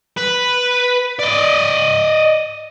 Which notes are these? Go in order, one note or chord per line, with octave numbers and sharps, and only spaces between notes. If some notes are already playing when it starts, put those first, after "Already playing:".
B4
D5 D#5